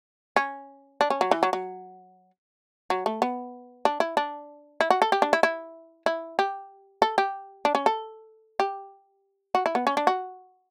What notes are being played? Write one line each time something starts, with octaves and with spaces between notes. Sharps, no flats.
C#4
D4
C#4
F#3
E3
F#3
F#3
F#3
A3
B3
D4
E4
D4
E4
F#4
A4
G4
D4
E4
E4
E4
G4
A4
G4
D4
C#4
A4
G4
F#4
E4
B3
C#4
D4
F#4